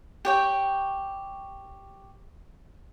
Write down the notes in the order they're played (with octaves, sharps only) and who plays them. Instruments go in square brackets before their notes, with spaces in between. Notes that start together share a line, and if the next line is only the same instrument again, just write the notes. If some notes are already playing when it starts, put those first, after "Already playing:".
[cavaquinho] G4 C#5 G5